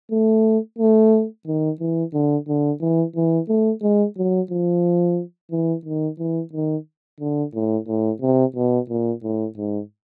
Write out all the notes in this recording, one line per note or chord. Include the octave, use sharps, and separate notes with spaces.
A3
A3
D#3
E3
D3
D3
E3
E3
A3
G#3
F#3
F3
E3
D#3
E3
D#3
D3
A2
A2
C3
B2
A#2
A2
G#2